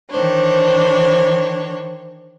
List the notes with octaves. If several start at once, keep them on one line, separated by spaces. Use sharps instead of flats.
D#3 E3 D4 C5 C#5